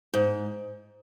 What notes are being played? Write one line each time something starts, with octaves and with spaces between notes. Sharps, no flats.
G#2